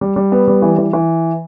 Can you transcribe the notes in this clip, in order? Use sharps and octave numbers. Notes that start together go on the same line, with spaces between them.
G3
G3
B3
G3
E3
E3
E3